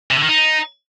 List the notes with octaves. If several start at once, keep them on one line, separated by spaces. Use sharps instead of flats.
C3
D3
D#3
D#4